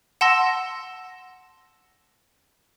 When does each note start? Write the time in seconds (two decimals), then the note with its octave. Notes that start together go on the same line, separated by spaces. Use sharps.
0.21 F#5 A5 C6 E6 A#6